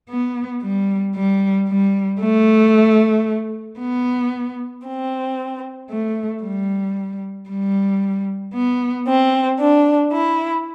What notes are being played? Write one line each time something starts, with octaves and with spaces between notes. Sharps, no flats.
B3
G3
G3
G3
A3
B3
C4
A3
G3
G3
B3
C4
D4
E4